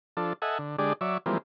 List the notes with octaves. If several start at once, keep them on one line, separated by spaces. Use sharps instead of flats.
F3 D4 A4
A4 D#5 E5 F#5 G#5
D3
D3 G#3 D4 G4 G#4 D5
F#3 C#5 D5 E5
E3 F3 G3 G#3 A#3 C4